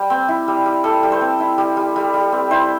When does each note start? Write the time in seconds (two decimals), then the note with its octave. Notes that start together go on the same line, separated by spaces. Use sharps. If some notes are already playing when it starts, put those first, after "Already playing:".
Already playing: G3
0.10 C4
0.29 E4
0.48 G3
0.66 G3
0.84 G3 A4
1.03 G3
1.12 C5
1.21 C4
1.40 E4
1.58 G3
1.77 G3
1.96 G3
2.14 G3
2.32 C4
2.51 E4 C5